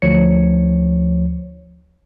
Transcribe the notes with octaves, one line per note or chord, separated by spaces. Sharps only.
D2 F3 C#5 C#7